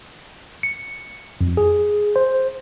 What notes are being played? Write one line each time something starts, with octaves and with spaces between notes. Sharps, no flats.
C#7
F2
G#4
C5